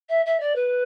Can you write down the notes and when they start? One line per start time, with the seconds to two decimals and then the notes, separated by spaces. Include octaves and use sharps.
0.09 E5
0.25 E5
0.39 D5
0.55 B4